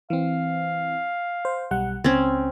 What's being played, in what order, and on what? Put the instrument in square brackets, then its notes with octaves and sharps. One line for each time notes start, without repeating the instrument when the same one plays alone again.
[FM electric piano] E3 C4 [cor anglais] F5
[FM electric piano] C5
B1 G3 F#5
[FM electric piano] C#2 [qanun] C4 C#4